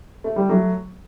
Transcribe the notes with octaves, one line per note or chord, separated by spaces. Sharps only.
A3
G3
F#3 A3